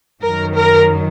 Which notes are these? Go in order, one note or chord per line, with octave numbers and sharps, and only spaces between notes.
F#2 D#3 F#3 A#4
A#4